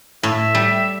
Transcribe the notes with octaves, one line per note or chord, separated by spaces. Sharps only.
A2 E5
G3